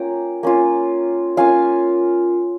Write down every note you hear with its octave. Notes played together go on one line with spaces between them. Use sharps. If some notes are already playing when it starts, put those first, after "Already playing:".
Already playing: A#3 C#4 F4 G5 A#5
A#3 C#4 F4
A#3 C#4 F4 F5 G#5